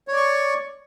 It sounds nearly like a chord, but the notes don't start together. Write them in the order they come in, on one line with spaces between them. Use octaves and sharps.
C#5 D5 C#6